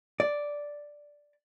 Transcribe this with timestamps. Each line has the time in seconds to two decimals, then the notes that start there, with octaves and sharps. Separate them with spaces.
0.20 D5